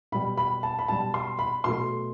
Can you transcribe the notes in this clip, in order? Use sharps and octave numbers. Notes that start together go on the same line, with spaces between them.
B2 G3 B5
B5
A5
B5
B2 G3 A5
C6
B5
B2 F#3 A3 C6